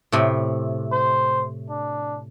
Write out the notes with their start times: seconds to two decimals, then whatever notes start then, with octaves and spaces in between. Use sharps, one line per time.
0.12 A2 C3
0.92 C5
1.70 D4